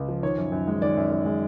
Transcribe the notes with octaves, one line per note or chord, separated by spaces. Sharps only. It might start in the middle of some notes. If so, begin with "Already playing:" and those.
Already playing: C#2
F3
D#3 C#5
F#2
F#2
G#3
D#3 D5
F#2
F#2
G#3